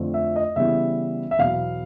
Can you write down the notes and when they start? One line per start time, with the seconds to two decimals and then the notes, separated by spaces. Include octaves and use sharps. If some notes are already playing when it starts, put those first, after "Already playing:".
Already playing: F2 D3 F3 A3 C4
0.14 E5
0.36 D#5
0.56 C#3 E3 G3 B3 E4 E5
1.31 E5
1.39 E2 B2 F#3 B3 F5